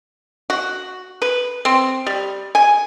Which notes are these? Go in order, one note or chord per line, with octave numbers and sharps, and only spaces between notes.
F#4
B4
C4
G3
G#5